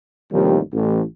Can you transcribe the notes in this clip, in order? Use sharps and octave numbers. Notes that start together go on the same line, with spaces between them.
A1 D#2 C3 D#3 F3 G3
A1